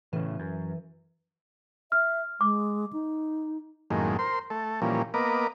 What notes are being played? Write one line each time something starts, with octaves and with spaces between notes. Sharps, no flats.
A2 C#3 E3
F#2
E5 F6
G#3 D6
D#4
F#2 A2 D#3 G#3 A#3
A#4 C5 C6
A3 A4
A#2 E3 F3 G3 A#3 C#4
A#3 B3 A#4 B4 D#5 D6